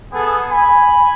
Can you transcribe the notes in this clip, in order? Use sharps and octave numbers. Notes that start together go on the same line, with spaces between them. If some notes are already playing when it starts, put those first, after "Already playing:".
B3 G#4 A4
G#5 B5